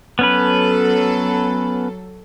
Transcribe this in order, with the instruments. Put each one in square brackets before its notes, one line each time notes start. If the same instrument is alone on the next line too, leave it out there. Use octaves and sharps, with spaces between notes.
[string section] F#3 A4 [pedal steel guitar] B3 C#4 B4